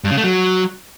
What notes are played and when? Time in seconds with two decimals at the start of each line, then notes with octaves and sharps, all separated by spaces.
0.04 G2
0.11 C#3
0.17 A3
0.24 F#3